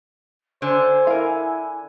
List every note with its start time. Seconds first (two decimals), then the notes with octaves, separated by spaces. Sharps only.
0.62 D3 C5 G#5
1.07 E4 A#4 F5